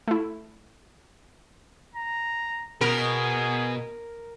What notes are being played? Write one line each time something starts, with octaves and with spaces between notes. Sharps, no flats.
A3 E4
A#5
B2 G#4 A#4